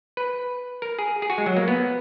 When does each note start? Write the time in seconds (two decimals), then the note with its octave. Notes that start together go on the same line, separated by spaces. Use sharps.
0.17 B4
0.82 A#4
0.99 G#4
1.22 G#4
1.30 F#4
1.38 G#3
1.46 F#3
1.57 A#3
1.68 B3